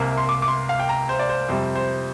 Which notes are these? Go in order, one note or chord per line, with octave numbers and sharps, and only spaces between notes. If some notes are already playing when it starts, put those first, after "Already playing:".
Already playing: C2 C3 A#3
C6
D6
D6
C6
F5
G5
A#5
C5
D5
C5
F2 C3 G3 C5
C5